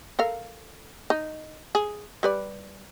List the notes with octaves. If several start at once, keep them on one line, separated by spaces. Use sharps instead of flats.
A4 A#4 F5
D#4
G#4
G3 B4 D5